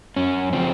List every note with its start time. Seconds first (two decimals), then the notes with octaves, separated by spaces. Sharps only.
0.16 F#2 C#4
0.53 C#3 F3 C4